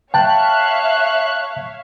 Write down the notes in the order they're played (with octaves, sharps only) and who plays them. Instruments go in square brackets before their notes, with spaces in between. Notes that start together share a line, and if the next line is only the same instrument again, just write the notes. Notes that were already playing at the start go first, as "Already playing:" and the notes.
[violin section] C#5 E5 F5 [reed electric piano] G5 A5 [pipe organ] F#6